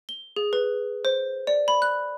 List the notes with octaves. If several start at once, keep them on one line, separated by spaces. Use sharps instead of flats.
G7
G#4
B4
C5
D5
B5
F#6